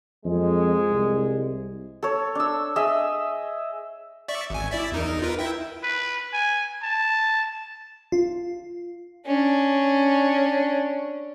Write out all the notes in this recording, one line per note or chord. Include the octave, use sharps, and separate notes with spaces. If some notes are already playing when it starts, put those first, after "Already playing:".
F2 G#3
C2
A4 C#5
D4 E6
G#4 D#5 E5
D5 E5 C#6
G#1 G#5
E4 D5 E5
E2 D#4 A#4
F4 A#4 B4
E4 E5 G5
B4
G#5
A5
F4
C#4 D4